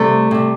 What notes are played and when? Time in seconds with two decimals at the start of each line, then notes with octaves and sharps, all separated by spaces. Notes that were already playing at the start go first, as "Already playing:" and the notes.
Already playing: C3 G3 A3
0.31 C3 G3